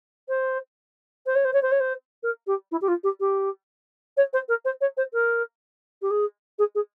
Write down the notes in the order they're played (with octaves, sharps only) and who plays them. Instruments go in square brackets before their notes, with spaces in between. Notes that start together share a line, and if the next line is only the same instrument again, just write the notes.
[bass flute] C5
C5
C#5
C5
C#5
C5
C#5
C5
A#4
G4
E4
G4
F4
G4
G4
C#5
C5
A#4
C5
C#5
C5
A#4
G4
G#4
G#4
G#4